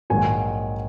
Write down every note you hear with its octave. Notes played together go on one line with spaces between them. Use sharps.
A#1 G#2 D#3 F#3 G#5